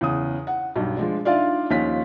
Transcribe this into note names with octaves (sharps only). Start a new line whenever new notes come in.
E2 C#3 D#6
F#5
B1 G2
F3 G#3 D4
D4 D#4 F4 D5 E5 F5
D#2 F3 C#4 F4 B6